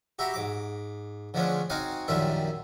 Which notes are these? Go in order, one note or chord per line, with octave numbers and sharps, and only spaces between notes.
F#4 G4 E5 A#5 B5
G#2 D6
D3 F3 G#3 A3 C#4 D4
C4 D#4 F#4 F5 F#5 G#5
A#1 F#2 D#3 G3 F4 E5